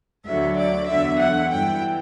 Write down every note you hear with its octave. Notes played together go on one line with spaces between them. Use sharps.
D2 D3 F#3 E5
D5
E2 D3 F#3 E5
F#5
G2 E3 G5